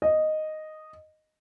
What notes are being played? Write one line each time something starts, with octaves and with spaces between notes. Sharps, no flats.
D#5